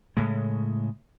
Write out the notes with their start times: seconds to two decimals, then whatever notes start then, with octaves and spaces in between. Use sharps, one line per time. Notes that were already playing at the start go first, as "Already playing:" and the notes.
0.17 A2 C#3 G#3